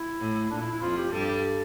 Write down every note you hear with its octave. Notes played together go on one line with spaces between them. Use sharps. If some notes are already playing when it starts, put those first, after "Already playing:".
Already playing: E4
A2
A#2 D4
E4
E4
F2 F3 F4
G4
G2 G3 A4